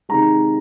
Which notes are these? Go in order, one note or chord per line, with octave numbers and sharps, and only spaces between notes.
C3 D#3 G#3 A#5